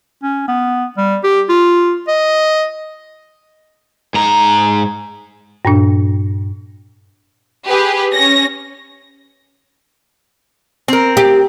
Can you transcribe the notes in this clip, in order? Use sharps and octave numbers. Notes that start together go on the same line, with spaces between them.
C#4
B3
G3
G4
F4
D#5
G#2 A#5
G2 A#2 D4
G4 G#4 B4
C#4 A#6
C4 A#4
G4